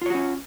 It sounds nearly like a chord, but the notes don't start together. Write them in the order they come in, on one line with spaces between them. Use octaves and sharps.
F4 C#5 F#4 C#4